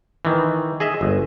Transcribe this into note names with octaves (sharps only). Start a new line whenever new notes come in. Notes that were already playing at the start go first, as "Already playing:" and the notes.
D#3 E3
G#4 D#5 E5
G1